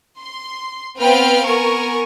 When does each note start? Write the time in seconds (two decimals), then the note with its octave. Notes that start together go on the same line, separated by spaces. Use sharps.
0.19 C6
0.98 B3 C4 B4 F5 G5 F6
1.45 B3 A#4 G#5 C#6